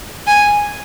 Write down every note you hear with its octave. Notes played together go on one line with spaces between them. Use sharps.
G#5